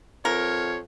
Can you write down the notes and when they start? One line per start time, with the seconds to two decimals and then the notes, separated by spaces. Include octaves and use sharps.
0.25 F2 A#4 C#5